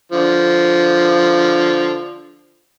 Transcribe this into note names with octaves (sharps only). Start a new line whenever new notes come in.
D3 F3